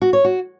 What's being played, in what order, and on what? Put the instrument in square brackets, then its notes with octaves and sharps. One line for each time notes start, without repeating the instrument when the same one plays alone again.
[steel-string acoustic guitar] F#4
C#5
F#4